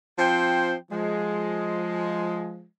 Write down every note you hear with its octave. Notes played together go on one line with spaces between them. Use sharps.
F3 C4 C5 G5
F3 G#3